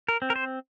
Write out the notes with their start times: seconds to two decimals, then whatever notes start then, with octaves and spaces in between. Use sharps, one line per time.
0.08 A#4
0.22 C4
0.30 A#4
0.36 C5